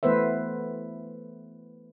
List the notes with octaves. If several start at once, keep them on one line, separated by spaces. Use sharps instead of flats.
E3 A3 B3 B4 C5 E5